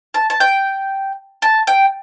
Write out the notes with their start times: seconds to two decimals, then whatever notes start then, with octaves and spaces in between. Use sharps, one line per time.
0.14 A5
0.30 A5
0.40 G5
1.42 A5
1.67 G5